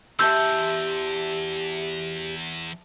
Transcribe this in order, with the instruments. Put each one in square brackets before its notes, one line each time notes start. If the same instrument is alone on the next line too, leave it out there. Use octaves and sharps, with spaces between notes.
[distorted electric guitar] E2 [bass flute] G4 [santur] E5 A5 C6 [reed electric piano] E6 G6